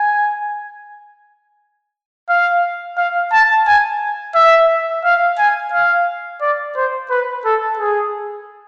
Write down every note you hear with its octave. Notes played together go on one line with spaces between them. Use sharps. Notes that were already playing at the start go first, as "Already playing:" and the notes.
Already playing: G#5
F5
F5
A5
G#5
E5
F5
G#5
F5
D5
C5
B4
A4
G#4